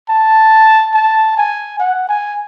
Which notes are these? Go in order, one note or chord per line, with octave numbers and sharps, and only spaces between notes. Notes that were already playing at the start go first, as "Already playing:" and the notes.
A5
A5
G#5
F#5
G#5